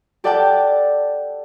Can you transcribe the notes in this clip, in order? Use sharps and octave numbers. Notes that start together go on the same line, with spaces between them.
G4 A4 D5 F#5 G5 A5